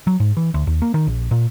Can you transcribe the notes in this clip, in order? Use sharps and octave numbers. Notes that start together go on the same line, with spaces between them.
F#3
G#2
E3
D2
D#2
A#3
D#3
A#1
A#2